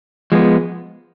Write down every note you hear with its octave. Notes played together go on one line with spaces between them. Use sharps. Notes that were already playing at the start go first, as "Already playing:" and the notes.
F3 G#3 B3